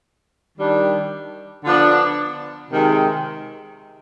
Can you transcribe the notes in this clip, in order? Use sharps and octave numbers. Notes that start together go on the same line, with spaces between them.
D#3 G3 D4
D3 F3 B3 D4
C3 D#3 G#3